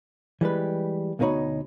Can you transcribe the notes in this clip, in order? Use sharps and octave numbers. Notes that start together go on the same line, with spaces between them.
E3 G3 G#3 B4
D2 B2 A3 D#4 C#5 B5